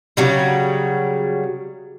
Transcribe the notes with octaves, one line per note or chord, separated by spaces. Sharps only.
C#3 F#3 G3